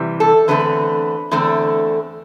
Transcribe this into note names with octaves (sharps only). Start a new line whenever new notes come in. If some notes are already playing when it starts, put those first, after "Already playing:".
Already playing: C3 E3 G3
A4
E2 D3 A3 C4 B4
E2 D3 A3 C4